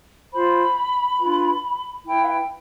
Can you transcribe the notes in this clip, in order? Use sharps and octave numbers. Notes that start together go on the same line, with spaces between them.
F4 C5 B5
D4 F4 B4
E4 B4 G5
F5
G5